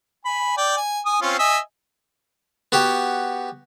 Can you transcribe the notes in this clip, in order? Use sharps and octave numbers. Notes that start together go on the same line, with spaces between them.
G#5 B5
D5 G5
G#5
G#5 D#6
C4 C#4 F4
D#5 E5 G#5
B3 F#4 G4